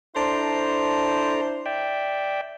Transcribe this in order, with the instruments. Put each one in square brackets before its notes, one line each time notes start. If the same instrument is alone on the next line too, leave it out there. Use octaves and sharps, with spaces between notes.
[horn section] D4 E4 C5 [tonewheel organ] A4 A#5
[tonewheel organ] D5 E5 G5